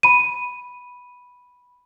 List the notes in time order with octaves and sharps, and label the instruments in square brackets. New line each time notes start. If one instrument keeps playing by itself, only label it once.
[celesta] B5 D#7